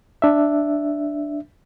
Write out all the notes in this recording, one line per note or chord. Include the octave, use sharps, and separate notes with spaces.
D4 E5